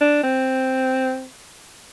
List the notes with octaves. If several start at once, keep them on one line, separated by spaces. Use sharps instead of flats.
D4
C4